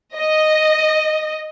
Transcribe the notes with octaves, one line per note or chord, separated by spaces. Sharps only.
D#5